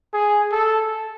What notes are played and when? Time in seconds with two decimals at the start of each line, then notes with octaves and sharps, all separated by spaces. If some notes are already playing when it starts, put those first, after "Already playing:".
0.13 G#4
0.52 A4